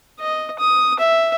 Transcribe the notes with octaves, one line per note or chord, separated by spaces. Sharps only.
D#5
D#6
E5